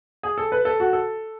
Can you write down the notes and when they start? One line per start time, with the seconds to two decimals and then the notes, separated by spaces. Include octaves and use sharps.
0.23 G#4
0.38 A4
0.52 B4
0.65 A4
0.80 F#4
0.93 A4